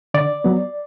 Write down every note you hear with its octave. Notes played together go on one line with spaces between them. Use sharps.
D3 D5
F#3 B3